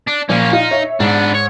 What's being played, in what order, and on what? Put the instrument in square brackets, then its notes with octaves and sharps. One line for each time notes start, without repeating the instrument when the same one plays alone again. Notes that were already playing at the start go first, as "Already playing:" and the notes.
[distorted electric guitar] D4
[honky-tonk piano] A#2 F3 [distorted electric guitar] A#3 C#4
[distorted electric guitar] D#4 [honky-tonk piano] F4
[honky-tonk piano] C#5 E5
[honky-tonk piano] G#2 [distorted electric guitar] B3 D4
[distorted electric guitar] C#5